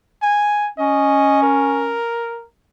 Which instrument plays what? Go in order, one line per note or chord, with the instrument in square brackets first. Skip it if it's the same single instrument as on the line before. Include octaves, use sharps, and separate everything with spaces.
[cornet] G#5
[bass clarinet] C#4 [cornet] D#5
[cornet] A#4